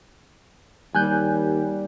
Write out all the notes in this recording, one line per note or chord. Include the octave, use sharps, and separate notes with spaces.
D#2 G3 G#5 F#6 G6